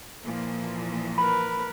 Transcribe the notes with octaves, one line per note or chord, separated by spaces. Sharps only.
A#2 E3 F3 A#3
A#4 B4 B5